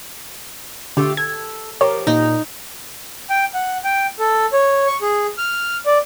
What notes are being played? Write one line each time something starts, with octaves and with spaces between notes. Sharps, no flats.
D3 A3 F4 G4
A4 G#6
F3 G4 A#4 C#5
A#2 D#4
G5
F#5
G5
A4
C#5
C#6
G#4
F6
D5